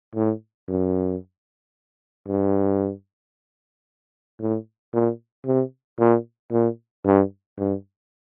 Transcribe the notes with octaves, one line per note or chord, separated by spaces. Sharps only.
A2
F#2
G2
A2
A#2
C3
A#2
A#2
G2
G2